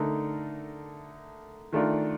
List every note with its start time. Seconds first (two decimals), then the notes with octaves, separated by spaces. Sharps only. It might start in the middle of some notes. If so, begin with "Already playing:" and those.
Already playing: D3 A3 D#4 A#4
1.73 D#3 A3 D4 F4 A#4